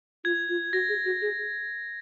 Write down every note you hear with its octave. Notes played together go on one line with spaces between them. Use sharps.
F4 G#6
F4
F#4 A#6
G#4
F#4
G#4